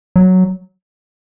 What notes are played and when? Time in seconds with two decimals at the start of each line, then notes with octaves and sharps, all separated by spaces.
0.16 F#3